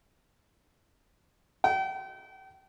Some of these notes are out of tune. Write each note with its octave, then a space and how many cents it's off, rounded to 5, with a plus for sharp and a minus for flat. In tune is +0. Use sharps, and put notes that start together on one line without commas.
G5 -35